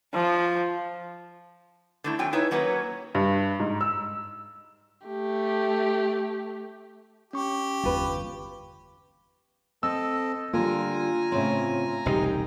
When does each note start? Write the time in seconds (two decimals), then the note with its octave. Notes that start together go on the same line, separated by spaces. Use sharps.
0.14 F3
2.04 D3 A3 E4
2.19 F#3 C4 G5 G#5
2.33 D#4 E4 B4 C#5 E5
2.51 F#3 A#3 C#4 B4
3.15 G2
3.60 G#2
3.81 E6
5.07 A3 G4
7.33 C#4 G4 C#6
7.83 G1 E2 F4 B4
9.83 C4 A4 D#5 E6
10.53 D3 G3 A#3 F4 G#5 A#5
11.32 A2 C#3 C4
12.06 E1 C2 C#3 D#4 F4 G4